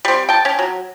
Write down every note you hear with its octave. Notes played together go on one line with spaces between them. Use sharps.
G3 C4
G5 A5
C#4
F#3